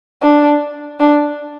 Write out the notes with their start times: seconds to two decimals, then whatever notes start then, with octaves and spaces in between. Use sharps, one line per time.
0.22 D4
1.00 D4